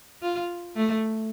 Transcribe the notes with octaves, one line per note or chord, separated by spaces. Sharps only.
F4
A3